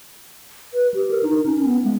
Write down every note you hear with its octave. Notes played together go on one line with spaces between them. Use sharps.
B4
G4
A#4
D#4
C#4
B3
G#3